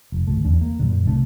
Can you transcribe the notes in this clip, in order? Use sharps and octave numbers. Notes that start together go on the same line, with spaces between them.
F1
G#1 C#2 A3
E2 D4
A#3
F#2 A#2 D3
C2 C3 A3 D4